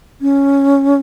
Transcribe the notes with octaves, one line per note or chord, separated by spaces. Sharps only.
C#4